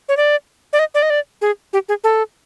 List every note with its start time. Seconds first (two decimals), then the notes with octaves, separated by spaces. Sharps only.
0.09 C#5
0.17 D5
0.73 D5
0.79 D#5
0.95 D5
1.03 D#5
1.10 D5
1.42 G#4
1.73 G4
1.89 G#4
2.04 A4